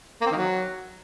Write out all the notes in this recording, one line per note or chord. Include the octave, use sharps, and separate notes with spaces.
A#3
C4
D#3
F#3